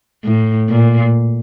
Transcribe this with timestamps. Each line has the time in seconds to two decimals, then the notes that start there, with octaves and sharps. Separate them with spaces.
0.24 A2
0.69 A#2